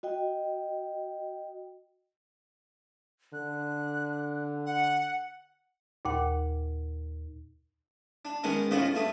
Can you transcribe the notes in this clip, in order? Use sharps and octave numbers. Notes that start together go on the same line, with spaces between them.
F#4 D#5 G5
D3 F#6
F#5
D#2 A#2 F#5
D4
D#3 G#3 B3 C#4
C#2 A2 C#3 F3 B3 D#5
G2 A3 D#6